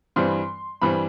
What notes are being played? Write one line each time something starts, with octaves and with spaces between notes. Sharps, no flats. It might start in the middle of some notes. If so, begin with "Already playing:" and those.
G2 E3 G3 C4 C6
G2 E3 G3 C4 B5